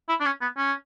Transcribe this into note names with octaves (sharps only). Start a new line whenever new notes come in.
E4
D4
C#4
B3
C#4